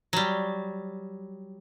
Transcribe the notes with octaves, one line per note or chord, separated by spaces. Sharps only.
F#3 G3